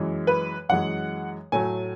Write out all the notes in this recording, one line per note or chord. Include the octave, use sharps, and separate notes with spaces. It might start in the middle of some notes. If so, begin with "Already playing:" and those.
Already playing: F#2 E3 G#3
B4
F#2 E3 G#3 F#5
A2 F#3 A3 G#5